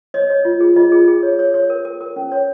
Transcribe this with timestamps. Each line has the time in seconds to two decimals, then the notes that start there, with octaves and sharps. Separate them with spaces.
0.14 C#5 D#5
0.30 C#5
0.45 F4
0.60 G#4
0.76 F4 D#5
0.92 G#4
1.08 G#4
1.23 C#5
1.39 C#5
1.54 C#5
1.70 A#4
1.85 A#4
2.01 A#4
2.16 C#4
2.32 C#5